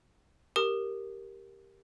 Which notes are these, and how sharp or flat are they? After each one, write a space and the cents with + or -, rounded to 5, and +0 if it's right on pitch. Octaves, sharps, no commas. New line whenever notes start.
G4 +0 A#4 +0 D#6 -20